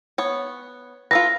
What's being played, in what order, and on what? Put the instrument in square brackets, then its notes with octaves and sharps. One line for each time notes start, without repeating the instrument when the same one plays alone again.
[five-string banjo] B3 C#5
[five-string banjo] F4 A4 B4 [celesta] A#6